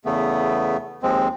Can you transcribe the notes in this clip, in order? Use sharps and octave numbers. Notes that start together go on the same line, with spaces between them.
E2 C#3 A3 B3
D#2 F3 G#3 C4